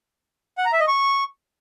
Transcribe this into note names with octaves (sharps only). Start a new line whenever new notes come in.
F#5
A#5
E5
D#5
C#6